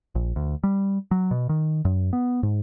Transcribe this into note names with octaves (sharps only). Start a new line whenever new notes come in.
A#1
D2
G3
F#3
B2
D#3
F#2
B3
G#2